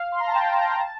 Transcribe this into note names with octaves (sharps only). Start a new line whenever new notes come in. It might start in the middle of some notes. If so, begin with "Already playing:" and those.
Already playing: F5
C6
A#5
A5
G5
A5
A#5
A5
A5